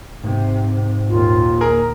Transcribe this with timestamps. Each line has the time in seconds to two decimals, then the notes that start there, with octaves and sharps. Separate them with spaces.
0.24 G#2 C3
1.09 A#1 D#2 F4
1.61 G#4 A#4